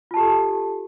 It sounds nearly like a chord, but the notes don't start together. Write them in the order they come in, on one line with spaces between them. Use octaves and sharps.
F4 A5 G4 A4